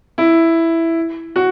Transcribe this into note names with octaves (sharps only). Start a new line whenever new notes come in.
E4
F#4